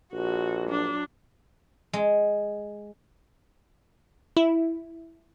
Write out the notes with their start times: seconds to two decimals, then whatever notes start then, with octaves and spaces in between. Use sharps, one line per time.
0.13 A#1 F#4
0.67 F#3 D4
1.93 G#3
4.37 E4